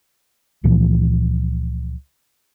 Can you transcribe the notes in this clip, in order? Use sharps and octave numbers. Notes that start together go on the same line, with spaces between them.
C#2 A#2 E3 F3